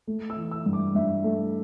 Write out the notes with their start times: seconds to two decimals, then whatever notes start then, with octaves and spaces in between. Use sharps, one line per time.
0.07 A3
0.30 E6
0.37 E3
0.51 E6
0.66 G2
0.73 D6
0.95 G2 E5
1.24 A3